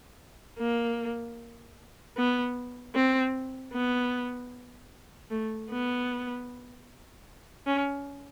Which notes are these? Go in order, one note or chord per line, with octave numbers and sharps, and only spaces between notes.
A#3
B3
C4
B3
A3
B3
C#4